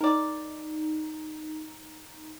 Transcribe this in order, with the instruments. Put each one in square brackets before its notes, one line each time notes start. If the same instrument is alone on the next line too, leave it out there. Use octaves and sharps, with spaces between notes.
[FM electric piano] D#4 [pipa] A#4 D5